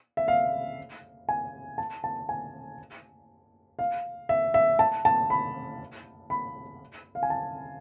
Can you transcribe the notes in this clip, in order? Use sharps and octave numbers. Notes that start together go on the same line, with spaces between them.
E5
F5
G#5
A5
A5
G#5
F5
E5
E5
A5
A5
B5
B5
F5
G#5
A5